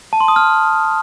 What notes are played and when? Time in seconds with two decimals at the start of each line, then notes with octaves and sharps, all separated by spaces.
0.13 A5
0.20 C6
0.28 D#6
0.36 F6